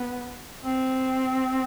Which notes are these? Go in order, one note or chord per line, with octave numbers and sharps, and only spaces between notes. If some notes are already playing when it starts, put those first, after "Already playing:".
Already playing: B3
C4